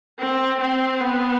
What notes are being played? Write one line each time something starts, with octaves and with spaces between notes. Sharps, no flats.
C4
C4
B3